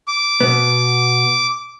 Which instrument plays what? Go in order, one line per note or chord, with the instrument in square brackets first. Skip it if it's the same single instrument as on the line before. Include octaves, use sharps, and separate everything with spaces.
[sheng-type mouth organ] D6
[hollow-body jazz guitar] B2 B3